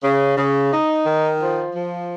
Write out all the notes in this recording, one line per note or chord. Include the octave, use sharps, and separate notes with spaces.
C#3
C#3
D#4
D#3
F3
F3